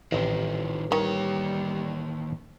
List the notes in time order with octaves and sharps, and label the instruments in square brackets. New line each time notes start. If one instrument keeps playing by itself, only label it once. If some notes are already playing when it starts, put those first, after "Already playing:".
[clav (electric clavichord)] A1 C4 G4 [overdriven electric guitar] D#3 F3
[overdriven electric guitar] D#2 C#5 [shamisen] D#3 [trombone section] G3